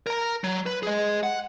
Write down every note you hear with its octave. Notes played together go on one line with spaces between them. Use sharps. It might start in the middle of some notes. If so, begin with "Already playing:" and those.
A#4 A#5
F#3
B4
G#4 D#5
F#5